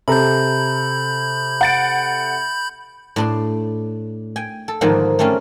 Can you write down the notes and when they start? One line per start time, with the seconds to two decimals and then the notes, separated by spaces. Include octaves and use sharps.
0.08 C3 A4 A#5 B5 G6
1.61 F#5 A6 D7
3.16 A2 D4 C6
4.36 G5 G#5
4.68 A4
4.81 G#2 D3 D#3 F3 A#3 D4
5.19 A3 A#3 C4 C#4 F4